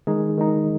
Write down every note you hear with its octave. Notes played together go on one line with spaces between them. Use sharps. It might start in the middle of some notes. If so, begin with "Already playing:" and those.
D#3 G#3 D#4 G#4
D#3 G#3 D#4